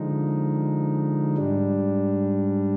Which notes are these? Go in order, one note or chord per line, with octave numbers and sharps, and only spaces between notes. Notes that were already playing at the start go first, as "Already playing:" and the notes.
Already playing: D3 F3 G#3 D#4
G#2 G3 D4